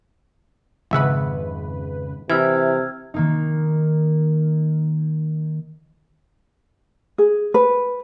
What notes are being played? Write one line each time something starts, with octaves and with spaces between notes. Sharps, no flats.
G#1 F2 C#3 B4 E5 F#5
C3 E3 E4 E5 E6 F6 G#6
D#3 A#3 D#4
G#4
B4